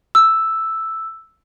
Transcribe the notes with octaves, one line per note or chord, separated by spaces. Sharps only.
E6